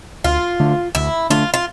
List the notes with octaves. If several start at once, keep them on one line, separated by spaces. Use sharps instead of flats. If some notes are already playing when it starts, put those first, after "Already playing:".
D2 F4
D3 A3 D4
D2 E4
D3 A3 D4 F4
F4